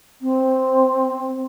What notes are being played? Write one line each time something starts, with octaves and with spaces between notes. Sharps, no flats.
C4